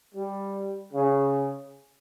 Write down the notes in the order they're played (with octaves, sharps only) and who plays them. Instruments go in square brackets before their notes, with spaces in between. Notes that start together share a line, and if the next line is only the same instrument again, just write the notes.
[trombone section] G3
C#3